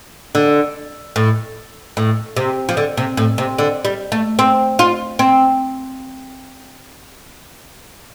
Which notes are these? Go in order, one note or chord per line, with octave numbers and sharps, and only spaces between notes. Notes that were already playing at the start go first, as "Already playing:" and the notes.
D3
A2
A2
C3
F3
D3
C3
A2
C3
D3
G3
A3
C4
F4
C4